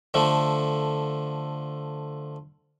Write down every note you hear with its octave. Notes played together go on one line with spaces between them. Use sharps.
D3 F3 A3